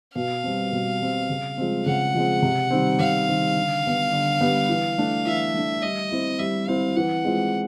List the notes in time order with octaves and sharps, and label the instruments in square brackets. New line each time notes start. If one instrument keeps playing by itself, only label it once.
[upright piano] B2 [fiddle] F5
[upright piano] G3 C4
B2
G3 C4
C#3
F3 G#3 C4
[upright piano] C#3 [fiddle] F#5
[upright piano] F3 G#3 C4
C3
D#3 G3 C4
[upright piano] C3 [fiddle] F5
[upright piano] D#3 G3 C4
D3
G3 B3
D3
G3 B3
E3
A3 D4
[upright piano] E3 [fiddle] E5
[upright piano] A3 D4
[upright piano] G3 [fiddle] D#5
[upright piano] C4 E4
[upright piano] G3 [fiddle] E5
[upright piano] C4 E4 [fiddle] F5
[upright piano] E3 [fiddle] F#5
[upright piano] G#3 C4 F4